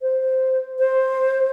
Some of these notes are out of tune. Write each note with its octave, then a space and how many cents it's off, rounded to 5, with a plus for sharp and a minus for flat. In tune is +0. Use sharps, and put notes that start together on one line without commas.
C5 -5
C5 +10